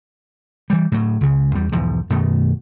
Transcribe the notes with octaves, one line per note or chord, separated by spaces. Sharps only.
E3 G3
A2 F#3
C#2 C#3
E2 G3
B1 E2 G#2 F3
F#2 B2 D#3 A3